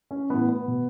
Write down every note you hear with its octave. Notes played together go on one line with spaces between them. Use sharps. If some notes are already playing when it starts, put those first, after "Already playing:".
C#4
A2 E3 B3
B3
B2